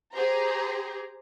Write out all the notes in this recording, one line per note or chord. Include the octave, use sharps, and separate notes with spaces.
G4 G#4 C5 A#5